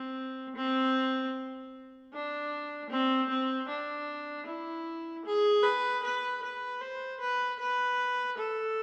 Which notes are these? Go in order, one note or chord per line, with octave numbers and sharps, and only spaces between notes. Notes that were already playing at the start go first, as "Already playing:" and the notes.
Already playing: C4
C4
D4
C4
C4
D4
E4
G#4
B4
B4
B4
C5
B4
B4
A4